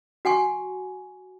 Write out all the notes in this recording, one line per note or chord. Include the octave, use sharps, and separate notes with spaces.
F#4 F#5 G#5 C#6